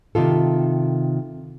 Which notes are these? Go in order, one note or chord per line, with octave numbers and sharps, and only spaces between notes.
C3 D#3 F4 A4